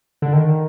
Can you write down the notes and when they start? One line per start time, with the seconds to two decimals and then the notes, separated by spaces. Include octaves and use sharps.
0.22 D3
0.33 D#3